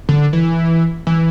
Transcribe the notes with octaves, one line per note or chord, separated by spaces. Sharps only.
D3
E3
E3